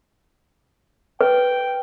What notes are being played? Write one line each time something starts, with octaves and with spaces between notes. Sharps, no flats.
B4 G5